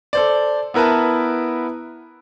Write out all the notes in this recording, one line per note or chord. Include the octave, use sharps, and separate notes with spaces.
A4 C5 D5
B3 E4 A#4 B4 A5